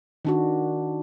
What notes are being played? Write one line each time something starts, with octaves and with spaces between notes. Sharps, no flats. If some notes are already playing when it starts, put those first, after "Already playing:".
D#3 D4 F#4